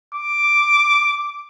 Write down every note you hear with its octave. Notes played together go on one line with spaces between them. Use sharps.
D6